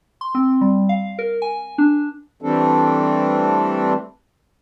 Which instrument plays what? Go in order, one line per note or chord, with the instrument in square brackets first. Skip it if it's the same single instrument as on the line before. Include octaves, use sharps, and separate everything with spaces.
[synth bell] C6
C4
G3
F5
A#4
G#5
D4
[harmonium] E3 G3 A3 C4 D4 A4